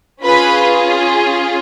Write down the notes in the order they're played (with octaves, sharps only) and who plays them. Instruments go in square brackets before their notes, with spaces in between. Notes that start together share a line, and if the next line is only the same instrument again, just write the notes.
[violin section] C#4 F4 G#4 B4 B5